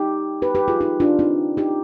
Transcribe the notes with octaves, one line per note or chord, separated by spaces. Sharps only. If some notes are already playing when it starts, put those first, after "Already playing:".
Already playing: D#4 G4
G4 B4
G4 B4
F4 G#4
D#4 G4
D4 F4
C4 D#4
D#4 G4